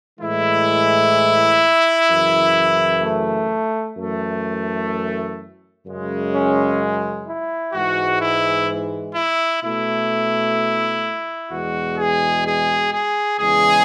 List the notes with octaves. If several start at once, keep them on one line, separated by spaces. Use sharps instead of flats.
A2 E3 G#3 E4
F#2 C#3 E3
A3
F#2 E3 A3
F#2 C#3 G#3
C#4
E4
G#2 E3 G#3 F#4
E4
E4
B2 A3 E4
E2 B2 G#3 F#4
G#4
G#4
G#4
E2 C#3 G#3 G#4